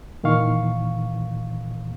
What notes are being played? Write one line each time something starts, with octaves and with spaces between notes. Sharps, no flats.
A#2 D#3 E3 F5 C#6